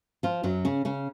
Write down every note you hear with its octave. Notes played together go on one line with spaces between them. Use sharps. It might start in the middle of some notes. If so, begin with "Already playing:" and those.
F3 F4
F#2 F#3
C#3 C#4
C#3 C#4